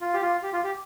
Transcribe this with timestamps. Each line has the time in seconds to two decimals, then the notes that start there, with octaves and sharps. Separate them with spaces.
0.01 F4
0.14 G4
0.22 F4
0.43 G4
0.53 F4
0.63 G4